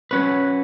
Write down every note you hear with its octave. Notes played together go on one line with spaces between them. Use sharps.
F#3 C#4 B4